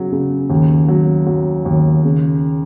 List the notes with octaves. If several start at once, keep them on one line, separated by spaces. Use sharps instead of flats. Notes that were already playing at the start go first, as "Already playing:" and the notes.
Already playing: C#3 F#3
C#3
D#2
F#3
F#3
D#2
C#3